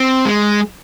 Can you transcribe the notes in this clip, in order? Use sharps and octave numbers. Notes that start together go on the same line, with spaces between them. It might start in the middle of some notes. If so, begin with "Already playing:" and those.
Already playing: C4
G#3